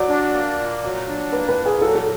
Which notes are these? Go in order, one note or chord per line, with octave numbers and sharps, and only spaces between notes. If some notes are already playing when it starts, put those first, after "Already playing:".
Already playing: F#3 D5
D4
A#3
A#2
F#3
D4
A#3 B4
B4
A#2
G#4
F#3 A4
A4